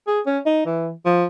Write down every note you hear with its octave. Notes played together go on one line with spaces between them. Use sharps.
G#4
C#4
D#4
E3
F3